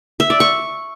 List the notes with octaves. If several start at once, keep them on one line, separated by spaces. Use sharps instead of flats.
E5
D5
C#6